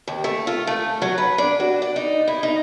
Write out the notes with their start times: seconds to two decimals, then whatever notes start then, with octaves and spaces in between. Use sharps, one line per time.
0.08 D#2
0.24 A3
0.47 F4
0.67 A3
1.02 F#3
1.18 B4
1.38 D4
1.60 F#4
1.82 D5
1.96 D#4
2.28 E4
2.43 D#4